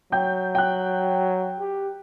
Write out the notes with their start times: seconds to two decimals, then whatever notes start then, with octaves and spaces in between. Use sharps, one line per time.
0.12 F#3 G5 G6
0.55 G5 F#6
1.60 G4